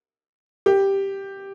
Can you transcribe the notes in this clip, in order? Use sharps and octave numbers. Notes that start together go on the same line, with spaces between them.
G4